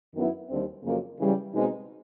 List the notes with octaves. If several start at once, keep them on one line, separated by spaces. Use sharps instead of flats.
F#2 D#3 F#3 B3 E4
D#2 D3 G3 C4
F2 C#3 F#3 A#3
C#3 E3 G3
B2 G#3 C4 D#4